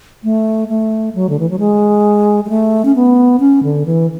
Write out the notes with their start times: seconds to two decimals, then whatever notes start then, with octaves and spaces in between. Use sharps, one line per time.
0.24 A3
0.69 A3
1.15 F#3
1.29 D3
1.39 E3
1.50 F#3
1.59 G#3
2.45 G#3
2.49 A3
2.85 C#4
2.96 B3
3.40 C#4
3.63 D3
3.86 E3